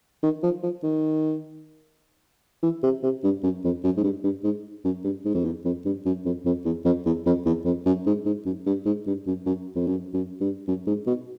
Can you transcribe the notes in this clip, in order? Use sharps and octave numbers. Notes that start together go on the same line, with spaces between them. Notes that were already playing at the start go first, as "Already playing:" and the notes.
D#3
F3
F3
D#3
E3
C3
C3
G2
F#2
F2
F#2
G#2
G2
G2
G#2
F#2
G2
G#2
F2
E2
F2
G2
F#2
F2
F2
E2
F2
E2
F2
E2
F2
F#2
G#2
G#2
F#2
G2
G#2
G2
F#2
F#2
F2
F#2
F#2
G2
F#2
G#2
B2